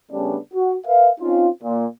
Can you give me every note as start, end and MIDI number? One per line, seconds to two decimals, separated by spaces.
0.11 0.38 49
0.11 0.38 55
0.11 0.38 57
0.11 0.38 59
0.11 0.38 61
0.11 0.38 62
0.54 0.75 66
0.86 1.10 70
0.86 1.10 71
0.86 1.10 76
0.86 1.10 77
1.20 1.49 60
1.20 1.49 61
1.20 1.49 63
1.20 1.49 65
1.63 1.86 46